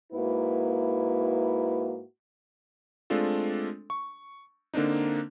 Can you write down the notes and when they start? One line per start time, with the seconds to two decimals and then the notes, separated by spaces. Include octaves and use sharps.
0.12 G#2 A#3 E4 F#4 B4
3.10 G#3 A3 C4 D4 F4 A4
3.90 C#6
4.74 D3 A#3 C4 D4 D#4